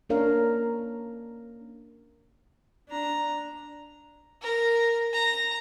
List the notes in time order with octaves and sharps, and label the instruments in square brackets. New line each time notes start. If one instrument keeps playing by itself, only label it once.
[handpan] A#3 C#4 D4 A#4 C#5 F5
[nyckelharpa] D4 A#5
[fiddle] A#4
A#5